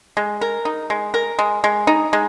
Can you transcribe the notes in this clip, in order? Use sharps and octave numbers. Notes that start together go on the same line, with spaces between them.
G#3
A#4
D#4
G#3
A#4
G#3
G#3
D#4
G#3